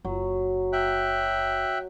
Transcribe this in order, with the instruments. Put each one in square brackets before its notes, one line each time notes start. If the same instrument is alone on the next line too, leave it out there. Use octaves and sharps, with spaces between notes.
[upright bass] F#1 [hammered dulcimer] F#3
[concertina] E5 G5 F#6